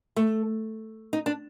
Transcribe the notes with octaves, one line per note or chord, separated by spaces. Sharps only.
A3
D#4
D4